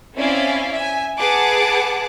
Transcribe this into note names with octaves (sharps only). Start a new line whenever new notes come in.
C4 C#4 E4 D5 E5 F5
E5 G#5
G#4 B4 F#5 A5 D6